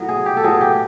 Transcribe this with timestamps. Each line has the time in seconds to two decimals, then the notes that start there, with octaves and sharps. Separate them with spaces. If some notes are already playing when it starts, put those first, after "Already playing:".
Already playing: A2 F#3 B3
0.09 G#4
0.26 G4
0.37 A4
0.43 A2 F#3 B3 G#4
0.61 G4